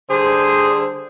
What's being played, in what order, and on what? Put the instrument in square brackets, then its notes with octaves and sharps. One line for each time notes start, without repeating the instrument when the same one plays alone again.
[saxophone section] D3 G3 G#4 [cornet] C5